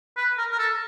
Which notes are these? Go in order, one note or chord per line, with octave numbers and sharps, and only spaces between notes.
B4
A#4
A#4
A4